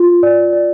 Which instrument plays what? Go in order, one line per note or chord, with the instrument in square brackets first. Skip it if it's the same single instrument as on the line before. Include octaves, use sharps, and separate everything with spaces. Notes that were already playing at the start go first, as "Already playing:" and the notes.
Already playing: [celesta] F4
D5
D5